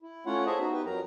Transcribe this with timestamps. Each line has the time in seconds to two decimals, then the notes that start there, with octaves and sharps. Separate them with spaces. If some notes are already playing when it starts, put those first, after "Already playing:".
0.02 E4
0.26 A3 C#4 E4 F4 C#5 F#5
0.46 G#4 C5 C#5 D#5 E5 A5
0.59 B3 D#4 F#4
0.73 D#4 G4 B4 G5
0.86 F2 F#3 A#4 A#5